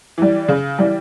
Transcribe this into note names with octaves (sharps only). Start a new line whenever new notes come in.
E3 G3
C#3
E3 G3